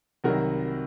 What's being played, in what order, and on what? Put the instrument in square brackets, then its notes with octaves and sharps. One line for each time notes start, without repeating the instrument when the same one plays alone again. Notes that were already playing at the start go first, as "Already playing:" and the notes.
[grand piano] C2 C3 D#3 F#3 F#4 A#4